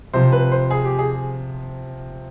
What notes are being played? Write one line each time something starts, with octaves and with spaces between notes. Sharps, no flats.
C3 F3 C5
B4
C5
G#4
G4
G#4